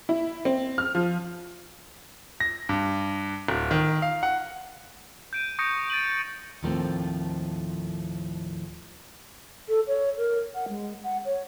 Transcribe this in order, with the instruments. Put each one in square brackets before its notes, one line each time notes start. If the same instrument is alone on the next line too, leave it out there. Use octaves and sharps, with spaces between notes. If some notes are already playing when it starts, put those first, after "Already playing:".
[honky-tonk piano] E4
C4
F6
F3
[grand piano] A#6
G2
D1
D#3
F5
F#5
[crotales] G6 D7 D#7
C#6 D#6 G6 A#6 C#7 D7
A6 D7 D#7 F#7
[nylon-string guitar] D#2 A2 F3 A3 A#3 C4
[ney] A4
C#5
A#4
F#5
G#3
F#5
C#5